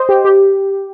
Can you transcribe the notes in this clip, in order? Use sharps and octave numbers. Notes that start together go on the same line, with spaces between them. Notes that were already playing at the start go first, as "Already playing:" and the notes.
Already playing: C5 D#5
G4
G4